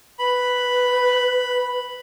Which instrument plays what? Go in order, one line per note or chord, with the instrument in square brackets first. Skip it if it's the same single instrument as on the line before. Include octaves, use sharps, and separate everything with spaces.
[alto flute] B4 [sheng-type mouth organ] B5